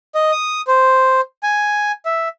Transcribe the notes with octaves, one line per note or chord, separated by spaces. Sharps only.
D#5
D#6
C5
G#5
E5